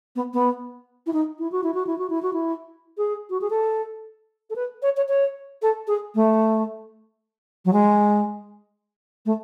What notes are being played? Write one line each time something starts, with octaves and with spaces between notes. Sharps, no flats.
B3
B3
E4
D#4
E4
F#4
E4
F#4
E4
F#4
E4
F#4
E4
G#4
F#4
G#4
A4
A4
B4
C#5
C#5
C#5
A4
G#4
A3
F#3
G#3
A3